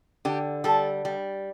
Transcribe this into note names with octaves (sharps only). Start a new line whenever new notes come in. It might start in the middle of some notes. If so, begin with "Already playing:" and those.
D3 G4
G3 A4
G3